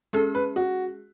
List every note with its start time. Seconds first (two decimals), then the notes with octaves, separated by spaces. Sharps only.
0.13 G#3 C#4 G#4 A4
0.35 B4
0.56 F#4